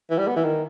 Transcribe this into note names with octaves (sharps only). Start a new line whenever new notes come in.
E3
G3
B3
E3
D#3